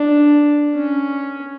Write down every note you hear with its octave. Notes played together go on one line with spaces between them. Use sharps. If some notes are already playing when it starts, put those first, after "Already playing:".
Already playing: D4
C#4